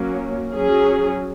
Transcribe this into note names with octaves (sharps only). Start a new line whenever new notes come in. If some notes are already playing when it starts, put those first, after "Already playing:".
Already playing: F#3 A#3 C#4
F#3 C#4 G#4